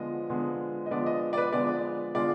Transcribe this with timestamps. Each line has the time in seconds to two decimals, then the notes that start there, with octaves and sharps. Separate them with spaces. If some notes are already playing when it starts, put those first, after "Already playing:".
Already playing: D3 F3 G#3 B3 D#5
0.30 D3 F3 G#3 B3
0.86 D#5
0.91 D3 F3 G#3 B3 D5
1.06 D#5
1.33 D5
1.37 B4
1.53 D3 F3 G#3 B3 D5
2.14 D3 G#3 B3 F4 D5